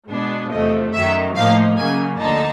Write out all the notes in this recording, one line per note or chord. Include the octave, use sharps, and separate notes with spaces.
B2 G#3 B3 D4
E2 C3 F3 A3 D#5
F#2 D#3 F#3 E5
A2 F3 A#3 D#4 F5
C#3 F#3 A#3 G#5
D2 D3 F3 A#3 D#4 A5